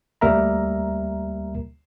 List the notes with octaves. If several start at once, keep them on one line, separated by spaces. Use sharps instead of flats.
D2 G3 A#3 A#4 E5 A#5